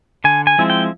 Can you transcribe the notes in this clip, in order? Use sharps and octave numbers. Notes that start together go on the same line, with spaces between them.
D3 G#5
G#5
F3 G#3 C4 E4
G5